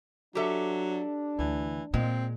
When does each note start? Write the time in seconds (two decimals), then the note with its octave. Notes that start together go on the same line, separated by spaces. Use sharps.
0.35 F#3 D4 G4 A4 E5
1.39 D2 E3
1.94 A#2 G#3 C4